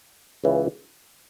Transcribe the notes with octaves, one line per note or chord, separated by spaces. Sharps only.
C#2 C#3 E3